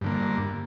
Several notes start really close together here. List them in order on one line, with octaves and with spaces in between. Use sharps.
G2 D3 A#3